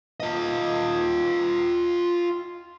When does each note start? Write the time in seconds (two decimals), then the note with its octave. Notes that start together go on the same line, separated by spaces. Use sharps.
0.20 F4 D#5